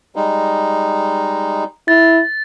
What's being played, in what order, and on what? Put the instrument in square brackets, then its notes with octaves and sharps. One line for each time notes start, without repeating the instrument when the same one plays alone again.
[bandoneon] G3 G#3 D#4
[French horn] E4 [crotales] A6